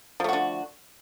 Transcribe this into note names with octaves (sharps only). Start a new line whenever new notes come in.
D3 F3 A3 F#4